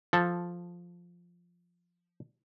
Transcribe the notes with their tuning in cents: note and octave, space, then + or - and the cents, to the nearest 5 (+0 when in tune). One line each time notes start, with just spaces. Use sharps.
F3 +0 A4 +0